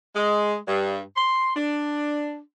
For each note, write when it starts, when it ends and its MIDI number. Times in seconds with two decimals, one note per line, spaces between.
0.16 0.56 56
0.68 1.00 43
1.16 1.51 84
1.56 2.39 62